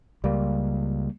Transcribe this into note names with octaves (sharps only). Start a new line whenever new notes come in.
C#2 G3 A#3